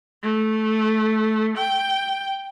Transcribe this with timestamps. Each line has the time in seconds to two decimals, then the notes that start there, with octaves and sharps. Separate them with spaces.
0.23 A3
1.57 G5